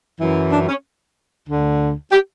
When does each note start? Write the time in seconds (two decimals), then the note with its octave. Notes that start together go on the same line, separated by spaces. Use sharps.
0.20 F#2 E3
0.52 D4
0.69 C#4
1.49 D2 D3
2.12 G4